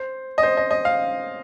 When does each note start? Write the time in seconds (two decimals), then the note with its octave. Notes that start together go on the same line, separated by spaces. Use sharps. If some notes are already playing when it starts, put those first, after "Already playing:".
Already playing: C5
0.38 D#5
0.43 C5
0.57 D#5
0.71 D#5
0.85 F5